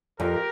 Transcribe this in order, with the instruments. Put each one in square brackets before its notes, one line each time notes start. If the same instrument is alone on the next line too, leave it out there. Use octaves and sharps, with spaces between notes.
[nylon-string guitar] F2 [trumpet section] G4 A#4